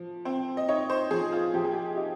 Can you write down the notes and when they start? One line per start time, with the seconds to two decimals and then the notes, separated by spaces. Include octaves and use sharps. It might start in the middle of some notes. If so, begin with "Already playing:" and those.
Already playing: F3
0.25 C4
0.57 D#5
0.68 D#4 C#5
0.90 C5
1.11 F3 G#4
1.32 F4
1.54 F3 G4
1.65 G#4
1.73 G4
1.96 D#4 G4